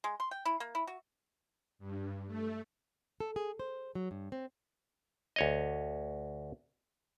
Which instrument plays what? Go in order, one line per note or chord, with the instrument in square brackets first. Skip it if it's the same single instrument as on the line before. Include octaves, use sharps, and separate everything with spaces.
[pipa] G#3
C6
G5
E4
A#3
E4
F#4
[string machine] G2
A3
[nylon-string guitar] A4
G#4
C5
F#3
G2
C4
[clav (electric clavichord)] D2 C#5 D#5